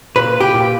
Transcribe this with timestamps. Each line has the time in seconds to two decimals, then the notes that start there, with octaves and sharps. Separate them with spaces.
0.16 A#2 B4
0.40 G4
0.54 A#2